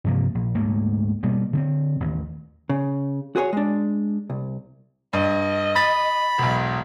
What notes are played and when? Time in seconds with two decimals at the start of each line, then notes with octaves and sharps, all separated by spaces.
0.04 G2 C3 F3 A#3
0.35 A#1
0.55 D2 G#2 A3 A#3
1.23 B2 G3 A#3 B3
1.53 D3 B3 C4
2.00 A1 D#2
2.69 C#3
3.36 F#4 G#4 B4 C#5
3.53 G#3 D4
4.30 C2
5.13 G2 D#5
5.76 B5 A6
6.38 E1 B1